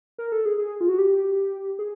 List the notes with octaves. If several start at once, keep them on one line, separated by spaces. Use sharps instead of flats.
A#4
A4
G#4
G#4
F4
F#4
G4
G#4